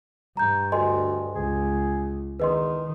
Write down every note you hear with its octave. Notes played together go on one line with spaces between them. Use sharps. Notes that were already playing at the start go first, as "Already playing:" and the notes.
G2 A#5 G6
D2 D#5 G#5 C6
C#2 G#4
E2 D#3 B4 D#5 C6